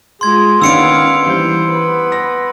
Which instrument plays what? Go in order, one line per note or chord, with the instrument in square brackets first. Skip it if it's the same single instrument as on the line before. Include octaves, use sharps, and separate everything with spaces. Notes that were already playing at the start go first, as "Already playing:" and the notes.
[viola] G#3 F4 [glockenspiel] C6 G#6
[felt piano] D#3 C#4 D4 [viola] B3 F5 [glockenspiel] E6 C#7 D7
[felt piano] E3 G3 [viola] C5
[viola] B3 B4
[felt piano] A#6